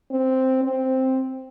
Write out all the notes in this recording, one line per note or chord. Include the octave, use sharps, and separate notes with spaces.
C4
C4